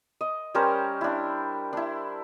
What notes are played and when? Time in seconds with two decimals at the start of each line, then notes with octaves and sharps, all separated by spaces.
0.21 D#5
0.55 G3 C#4 A#4 C5
1.01 D4 E4
1.73 D4 E4